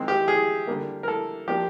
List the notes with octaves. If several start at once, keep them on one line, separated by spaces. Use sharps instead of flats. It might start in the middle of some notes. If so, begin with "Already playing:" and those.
Already playing: D#3 G#3 C4
G4
G#4
D3 G3 A#3
A#4
A4
F3 A#3 D4 G4